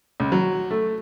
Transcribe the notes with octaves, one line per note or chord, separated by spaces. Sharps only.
C#2
F#3
A3